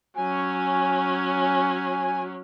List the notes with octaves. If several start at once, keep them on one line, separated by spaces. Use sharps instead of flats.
F#3 C#4 G#5